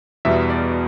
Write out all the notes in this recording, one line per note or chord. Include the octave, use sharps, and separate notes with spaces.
E2 B2 G3 B3 E5
D5